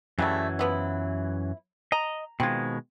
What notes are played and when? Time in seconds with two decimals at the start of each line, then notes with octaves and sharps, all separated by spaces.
0.19 F#2 C#3 E3 F#3 G3 A3
0.59 F3 B3 E4
1.92 D#5 A#5
2.40 B2 D#3 G#3 C4 F4